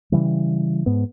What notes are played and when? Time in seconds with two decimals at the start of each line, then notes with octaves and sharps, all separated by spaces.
0.12 C#3 E3 G3
0.86 G#2 B3